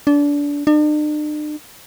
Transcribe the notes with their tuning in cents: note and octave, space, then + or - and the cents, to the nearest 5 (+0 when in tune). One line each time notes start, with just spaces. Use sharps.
D4 -25
D4 +45